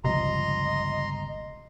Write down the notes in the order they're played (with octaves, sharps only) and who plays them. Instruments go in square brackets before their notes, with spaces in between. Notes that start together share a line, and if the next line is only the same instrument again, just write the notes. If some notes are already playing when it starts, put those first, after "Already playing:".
[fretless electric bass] G1 C#2 F3 [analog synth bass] C3 [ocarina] D#5 [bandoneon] A#5 C6